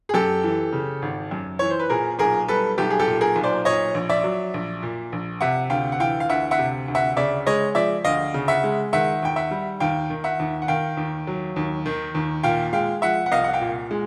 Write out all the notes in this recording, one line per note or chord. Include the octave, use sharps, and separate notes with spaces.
G#4
F#2 G4 A4
E3
C#3
G#1
F#2
E3 C#5
C5
B4
A#2 G#4 A#4
B1 G#4 A#4
G3 A4 B4
B1 G4 A4
G#4
G4 A4
A#2
G#4 A#4
B1
C5 D5
A#2 C#5 D#5
A#1
D5 E5
F#3
A#1
A#2
A#1
C3 E5 F#5
D2 F5 G5
F#5
E3 F5 G5
F5
D2 E5 F#5
E5 F#5
C3
D2
E5 F#5
C#3 D5 E5
G#3 C#5 D#5
F3 D5 E5
D2 D#5 F5
C#3
E5 F#5
G#3
D#3 E5 F#5
D#2 G5
E5 F#5
G3
D#2 F5 G5
D#3
E5 F#5
D#2
F#5
D#3 F5 G5
D#2
F#3
D#2
D#3
D#2
A#2 F5 G5
G#3 F5 G5
F3 E5 F#5
F#5
C2 D#5 F5
F#5
F5 G5
A#2
G#3